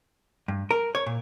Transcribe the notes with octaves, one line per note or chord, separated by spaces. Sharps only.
G2
A#4
C#5
A#2